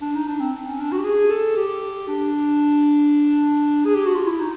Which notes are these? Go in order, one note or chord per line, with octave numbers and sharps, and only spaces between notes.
D4
D#4
D4
C4
C#4
D4
F#4
G4
G#4
A4
G4
D4
G#4
G4
F#4
F4
E4
D#4